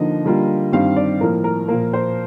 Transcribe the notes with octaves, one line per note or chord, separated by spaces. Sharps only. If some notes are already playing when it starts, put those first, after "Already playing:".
Already playing: D3 F3 A#3 D#4 D#5
D3 G3 A#3 F4
G2 D#3 G3 C4 F5
D5
A2 F3 A#3 A#4
A#4
A#2 F3 A#3 A#4
C5